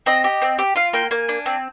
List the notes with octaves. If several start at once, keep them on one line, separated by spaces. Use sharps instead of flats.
C4 D#5
G4
C4
G4
F4 F5
A#3 G5
A#3 G#5
D4
C4